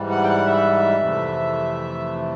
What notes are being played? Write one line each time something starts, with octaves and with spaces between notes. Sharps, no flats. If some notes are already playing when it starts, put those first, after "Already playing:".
Already playing: G#2 E3 G3
F#5
G5
F#5
E5
F2 C3 E3 A3